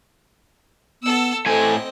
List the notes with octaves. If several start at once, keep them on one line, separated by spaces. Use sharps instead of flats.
B3 A4 E6
A2 C4 A4 D#5 G#5